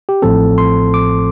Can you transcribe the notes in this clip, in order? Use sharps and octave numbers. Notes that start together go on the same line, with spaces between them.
G4
A1 A2 F3 C4 A4
C6
D6